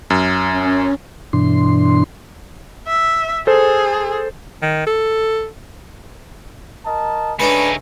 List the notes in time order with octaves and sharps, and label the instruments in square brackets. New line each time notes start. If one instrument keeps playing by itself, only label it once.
[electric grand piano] F#2
[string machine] C#4
[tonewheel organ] G2 B2 E3 D4 C6
[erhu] E5
[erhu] G#4 [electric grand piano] A4 C5
[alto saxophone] D#3
A4
[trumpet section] A#4 D#5 A5
[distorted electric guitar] C#3 D#4 [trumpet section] A3 C#5 G#5 [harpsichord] D4 B4